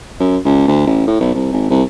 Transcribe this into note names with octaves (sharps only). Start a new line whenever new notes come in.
F#2
C#2
D2
A1
A2
B1
C2
G#1
C2